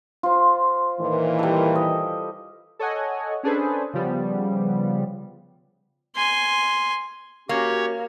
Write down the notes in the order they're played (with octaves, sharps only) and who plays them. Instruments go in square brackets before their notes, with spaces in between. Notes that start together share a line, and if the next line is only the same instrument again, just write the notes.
[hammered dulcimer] F4 C5
[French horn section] A#2 D#3 E3
[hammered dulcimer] G3 A4
D#5
[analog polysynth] A4 C#5 D#5 F#5 G#5
C#4 D4 G#4 A4 B4 C5
C#3 F3 G3 B3
[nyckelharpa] G#5 C6
[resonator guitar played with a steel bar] A#3 [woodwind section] C#4 F#4 G4 [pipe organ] C#5